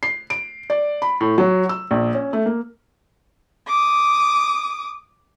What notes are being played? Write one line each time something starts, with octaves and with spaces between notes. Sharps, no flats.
C7
D7
D5
B5
A2
F#3
E6
A#1
C#4
A3
A#3
D6 D#6